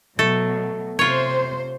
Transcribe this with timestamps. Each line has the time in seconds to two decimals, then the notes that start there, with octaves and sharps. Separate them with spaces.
0.19 B2 F#3 A3 A4
0.99 C3 F4 C5 C#5